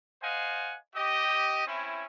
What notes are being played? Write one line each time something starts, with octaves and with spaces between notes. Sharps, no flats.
C5 D#5 F5 F#5 G#5
G4 D#5
C4 C#4 E4